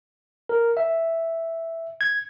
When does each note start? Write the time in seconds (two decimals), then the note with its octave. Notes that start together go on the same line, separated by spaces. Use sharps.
0.49 A#4
0.77 E5
2.01 G#6